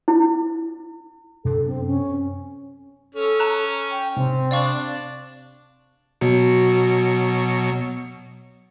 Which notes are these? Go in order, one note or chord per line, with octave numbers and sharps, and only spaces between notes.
E4
F#2 C3 D4 A4
C4
C#4
C#4 A4
A5 A#5 F#6
G5
C3 C4
D4 D5 F5 C#6
B2 F#3 C#7